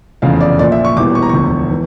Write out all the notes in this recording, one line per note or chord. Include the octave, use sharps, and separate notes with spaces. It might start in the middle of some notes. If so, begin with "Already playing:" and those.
F1 E2 C#3 F3 F5
D5
A#1 A#2 F3 D5
E5
C#6
E1 E2 E3 G3 D6
C#6
A#5
E1 D2 D3 F3 C#6
E3